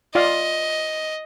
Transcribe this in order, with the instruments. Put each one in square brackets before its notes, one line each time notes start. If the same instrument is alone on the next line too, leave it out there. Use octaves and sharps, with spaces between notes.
[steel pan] F4 D5 F5 [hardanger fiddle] D#5